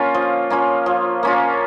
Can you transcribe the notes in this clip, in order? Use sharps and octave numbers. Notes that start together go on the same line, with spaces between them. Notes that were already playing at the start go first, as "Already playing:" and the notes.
Already playing: A#3 C#4 F4
F3
A#3 C#4 F4
F3
A#3 C#4 F4